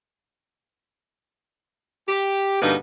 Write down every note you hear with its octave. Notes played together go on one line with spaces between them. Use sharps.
G4
G2 B2 D3 A#3 B3 D#4